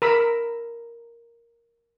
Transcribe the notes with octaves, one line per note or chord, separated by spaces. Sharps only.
A#4 B5 E6